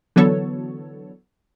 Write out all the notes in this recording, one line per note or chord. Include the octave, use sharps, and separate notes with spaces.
D3 E3 F#3 B3 A4 C#5